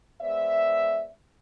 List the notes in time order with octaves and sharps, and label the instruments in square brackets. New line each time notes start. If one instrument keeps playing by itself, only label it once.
[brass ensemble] G#3 B3 C5 D5 E5